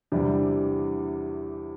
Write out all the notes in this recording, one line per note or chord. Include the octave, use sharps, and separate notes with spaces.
E2 C3 E3 G3 D4